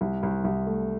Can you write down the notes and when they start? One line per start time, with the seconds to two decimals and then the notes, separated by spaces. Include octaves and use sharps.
0.01 C2
0.23 C2
0.44 C2
0.66 A3